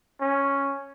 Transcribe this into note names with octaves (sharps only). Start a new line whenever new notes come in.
C#4